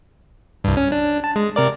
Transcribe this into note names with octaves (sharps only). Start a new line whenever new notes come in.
C2 G2
C#4
D4
A5
G#3
C3 A#4 D5